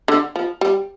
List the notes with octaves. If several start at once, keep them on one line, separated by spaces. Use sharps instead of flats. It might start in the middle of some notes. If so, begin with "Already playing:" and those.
D3
F3
G3